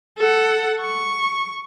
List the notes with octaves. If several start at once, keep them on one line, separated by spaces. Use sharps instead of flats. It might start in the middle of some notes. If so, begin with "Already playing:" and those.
A4 F#5
C#6